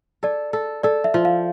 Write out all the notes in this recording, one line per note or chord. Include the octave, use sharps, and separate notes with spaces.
A4 D5
A4
A4 D5
E5
F3
F5